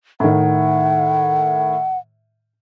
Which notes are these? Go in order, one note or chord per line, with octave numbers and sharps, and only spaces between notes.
A2 D#3 F#5